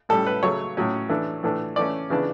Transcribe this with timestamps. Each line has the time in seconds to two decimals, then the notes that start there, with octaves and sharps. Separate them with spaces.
0.09 A2 G3 C#4 A4
0.27 B4
0.43 C#3 F#3 A3 C#5
0.77 A2 F#3 C#4
1.09 E3 A3 D4
1.43 A2 E3 A3 D4
1.76 E3 A3 C#4 D5
2.10 C#3 E3 B3 D4